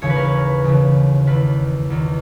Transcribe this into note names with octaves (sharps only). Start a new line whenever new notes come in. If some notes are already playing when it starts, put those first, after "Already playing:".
D#2 C#3 E3 C#5
B4
A#4
B4
D#2 C#3 E3
E2 D#3 B4
E2 D#3